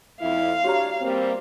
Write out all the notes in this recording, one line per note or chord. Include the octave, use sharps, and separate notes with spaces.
F2 E4 F5
D4 F#4 G4 C#5 A#5
G3 A#3 C4